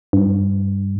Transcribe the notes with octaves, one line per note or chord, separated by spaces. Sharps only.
G2